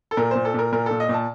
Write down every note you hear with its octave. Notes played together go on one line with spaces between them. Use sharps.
A4
A#2 A#4
A#2 C5
A4
A#2 A#4
A#2 A#4
A#2 A4
D#5
A#2
A5